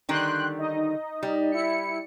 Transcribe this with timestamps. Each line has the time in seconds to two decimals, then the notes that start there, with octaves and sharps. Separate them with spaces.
0.09 D3 D#3 G3 G5 C6 F#6
0.59 D#4 D#5
1.23 G3
1.52 E4 C#7